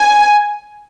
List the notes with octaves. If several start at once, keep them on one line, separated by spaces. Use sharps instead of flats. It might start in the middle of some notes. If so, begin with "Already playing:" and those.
Already playing: G#5